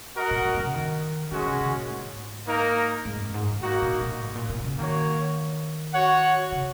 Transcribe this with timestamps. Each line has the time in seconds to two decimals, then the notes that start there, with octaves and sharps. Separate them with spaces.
0.16 F#4 A#4 D#5 F#5
0.31 A#2
0.45 F#2
0.54 A#2
0.59 C#3
0.74 D#3
1.31 D#3 G#3 C#4 F#4
1.46 C#3
1.60 C#3
1.76 A#2
1.90 G#2
2.47 A#3 D#4 A#4
3.05 G#2
3.20 F#2
3.34 G#2
3.48 D#3
3.62 A#3 D#4 F#4
3.82 A#2
4.01 A#2
4.21 G#2
4.36 A#2
4.49 A#2
4.64 C#3
4.78 D#3 A#3 F#4 C#5
5.94 F#4 C#5 F#5
6.52 C#3